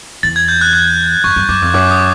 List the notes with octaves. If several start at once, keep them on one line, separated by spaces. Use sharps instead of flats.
E2 A6
G#6
G6
F#6
F#6
F#2 C#6
F#2
F#2 D6
F2
F#2 D6
D#6